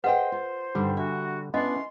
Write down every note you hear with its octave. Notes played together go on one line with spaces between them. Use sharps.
G#4 B4 C5 D#5 F#5 G5
F4
G2 D3 D#3 G3
D4 F#4 E5
B3 C#4 D4 E4 B4 D#5 C6